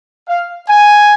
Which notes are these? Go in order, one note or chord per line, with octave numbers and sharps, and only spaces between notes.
F5
G#5